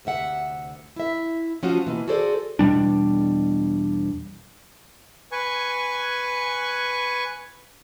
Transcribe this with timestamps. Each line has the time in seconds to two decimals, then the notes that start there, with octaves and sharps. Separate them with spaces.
0.05 D2 C3 E5 F#5
0.96 E4 E5
1.63 F3 A3 C#4 F4 F#4
1.87 B2 E3 A#3
2.08 F#4 G#4 A4 C5 D5
2.59 E2 B2 G3 D4
5.32 B4 G#5 C#6